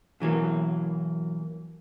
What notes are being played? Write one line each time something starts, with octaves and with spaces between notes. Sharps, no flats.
B2 E3 F#3 A#3